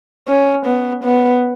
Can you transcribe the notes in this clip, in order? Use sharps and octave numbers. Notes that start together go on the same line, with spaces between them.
C#4
B3
B3